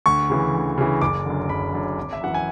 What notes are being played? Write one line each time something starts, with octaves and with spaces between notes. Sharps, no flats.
D2 C#6
C#3 E3
D2
C#3 E3
F#1 D6
F#2 D3
F#1 B5
F#2 D3
G#1
E5
F#2 E3 F#5
G#5